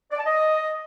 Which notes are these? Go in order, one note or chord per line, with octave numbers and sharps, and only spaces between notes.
D5
A5
D#5